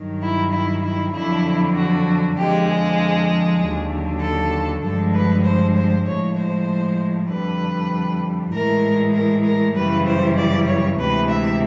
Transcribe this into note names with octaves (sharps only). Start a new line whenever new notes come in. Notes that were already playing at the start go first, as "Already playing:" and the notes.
Already playing: G2 D#3 F#3
E4
E4
E4
F2 D3 F#3 E4
F#4
F2 D3 F3 G#3 G4
G#4
D#2 D3 F#3
A4
G2 D3 F3 G#3 A4
B4
C5
C5
A2 F3 G#3 C#5
C5
F2 D3 G3 B4
A2 E3 G#3 A#4
A#4
A#4
F#2 C#3 E3 G3 B4
C5
D5
C#5
D2 C3 E3 G#3 B4
E5